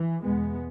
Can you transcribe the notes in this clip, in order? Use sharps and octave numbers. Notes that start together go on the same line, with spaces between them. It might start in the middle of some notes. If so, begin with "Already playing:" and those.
Already playing: E3
E2 B2 G#3 B3